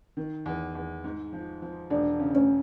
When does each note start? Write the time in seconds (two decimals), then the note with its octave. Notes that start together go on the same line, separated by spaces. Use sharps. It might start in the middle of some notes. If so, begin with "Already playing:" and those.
0.17 D#3
0.46 E2
0.75 E2
1.04 G#2
1.33 F3
1.62 F3
1.90 E1 D4
2.19 C#3
2.34 C#4